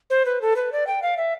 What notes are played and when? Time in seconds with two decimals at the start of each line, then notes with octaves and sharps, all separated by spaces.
0.10 C5
0.26 B4
0.42 A4
0.56 B4
0.72 D5
0.87 G5
1.02 F5
1.17 E5